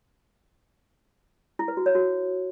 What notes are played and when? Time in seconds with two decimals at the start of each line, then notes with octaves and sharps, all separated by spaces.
1.59 E4
1.68 B4
1.77 F#4
1.86 C#5
1.95 F#4